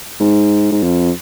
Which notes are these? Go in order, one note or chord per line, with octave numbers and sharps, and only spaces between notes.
G#2
G#2
F2